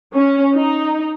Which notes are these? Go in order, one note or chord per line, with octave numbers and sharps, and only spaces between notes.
C#4
D#4